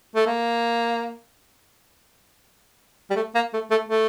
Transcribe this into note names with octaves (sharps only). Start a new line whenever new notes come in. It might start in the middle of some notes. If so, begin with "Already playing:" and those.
A3
A#3
G3
A3
A#3
A3
A3
A3